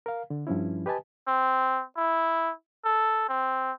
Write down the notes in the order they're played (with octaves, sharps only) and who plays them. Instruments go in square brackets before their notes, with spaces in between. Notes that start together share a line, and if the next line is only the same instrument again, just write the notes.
[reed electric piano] A#4 F5
D3
G2 F3 C#4 E4
G4 B4 D#5 G#5 A5
[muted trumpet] C4
E4
A4
C4